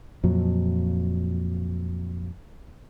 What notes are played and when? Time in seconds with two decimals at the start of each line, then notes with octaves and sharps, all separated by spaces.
0.24 F2 A#2 F#3